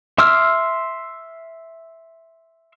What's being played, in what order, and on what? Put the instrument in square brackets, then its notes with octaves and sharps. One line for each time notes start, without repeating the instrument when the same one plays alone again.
[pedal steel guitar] E5 C6 D6 E6 F6